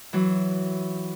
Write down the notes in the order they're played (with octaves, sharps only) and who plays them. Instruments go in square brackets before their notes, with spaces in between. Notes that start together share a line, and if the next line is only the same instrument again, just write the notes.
[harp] E3 F#3